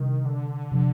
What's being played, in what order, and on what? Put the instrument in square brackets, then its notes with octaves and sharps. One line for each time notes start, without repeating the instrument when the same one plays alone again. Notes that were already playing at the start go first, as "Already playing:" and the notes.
Already playing: [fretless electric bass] C3 G3 D4 [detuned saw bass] D#3
[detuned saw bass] D3
[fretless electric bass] C3 F3